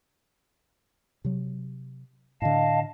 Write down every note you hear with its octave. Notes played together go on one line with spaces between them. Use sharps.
C3 F#3
A2 D3 D#5 F5 A5